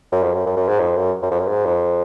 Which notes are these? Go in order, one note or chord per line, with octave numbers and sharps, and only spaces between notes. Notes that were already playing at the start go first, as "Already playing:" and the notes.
F#2
F2
F#2
F#2
F#2
G#2
F2
F#2
F#2
F2
F#2
G#2
F2